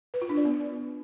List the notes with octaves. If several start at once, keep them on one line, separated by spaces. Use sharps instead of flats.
B4
F4
D4
D5
B3